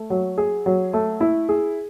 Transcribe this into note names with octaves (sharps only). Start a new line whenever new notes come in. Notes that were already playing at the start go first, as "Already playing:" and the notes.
Already playing: A3
F#3
G#4
F#3
A3
E4
G#4